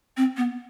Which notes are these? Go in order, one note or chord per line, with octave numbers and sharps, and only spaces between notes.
C4
B3